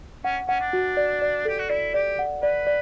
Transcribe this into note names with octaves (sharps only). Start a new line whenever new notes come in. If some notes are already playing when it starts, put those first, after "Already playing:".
C#4 F#5
C#4 F#5
D4
F#4
D5
D5
G4 A4
F#4
E4 D5
G4 D5
F#5
B4 D5
D5